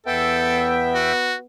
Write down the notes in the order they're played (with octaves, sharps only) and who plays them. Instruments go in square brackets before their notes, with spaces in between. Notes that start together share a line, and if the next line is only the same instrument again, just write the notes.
[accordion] E2 E5 G5 [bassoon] B3 [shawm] A4
[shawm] F#4